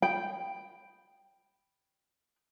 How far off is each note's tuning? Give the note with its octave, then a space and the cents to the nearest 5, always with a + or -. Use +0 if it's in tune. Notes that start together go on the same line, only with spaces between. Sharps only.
G5 +0 B5 +0